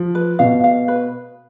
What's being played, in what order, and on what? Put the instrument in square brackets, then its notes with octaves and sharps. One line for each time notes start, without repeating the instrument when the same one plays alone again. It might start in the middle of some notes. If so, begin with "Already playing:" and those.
Already playing: [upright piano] F3
[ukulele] B4
[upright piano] B2 [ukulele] F5
[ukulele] F5
B4